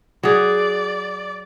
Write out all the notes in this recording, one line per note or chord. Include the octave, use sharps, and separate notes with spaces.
F#3 G#4 D5